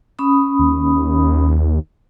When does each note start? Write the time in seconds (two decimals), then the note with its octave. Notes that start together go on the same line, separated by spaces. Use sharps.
0.19 C#4 B5 D#6
0.59 D#2